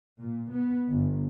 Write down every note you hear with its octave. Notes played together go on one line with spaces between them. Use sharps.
A#2
B3
G1